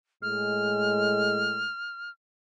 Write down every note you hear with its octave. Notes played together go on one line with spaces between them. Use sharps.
A2 G#3 F6